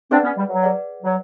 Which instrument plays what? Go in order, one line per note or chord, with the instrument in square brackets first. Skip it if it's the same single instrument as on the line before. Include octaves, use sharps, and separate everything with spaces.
[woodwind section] C4 D4 [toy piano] G#4 B4 D5 F#5
[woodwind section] B3 C#4
G3
F#3
[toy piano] G#4 B4 D5 F#5
[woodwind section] F#3